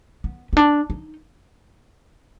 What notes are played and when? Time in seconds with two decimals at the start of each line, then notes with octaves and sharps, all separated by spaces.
0.24 B3
0.53 B3
0.57 D4
0.90 D#4